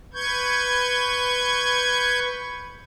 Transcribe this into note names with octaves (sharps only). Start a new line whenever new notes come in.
B4 C#6 G6 G#6